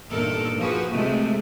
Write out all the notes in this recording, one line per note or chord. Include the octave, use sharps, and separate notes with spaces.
E2 G2 A#2 D#4 A4 A#4
F3 A#3 F#4 G#4 B4
C3 G#3 A3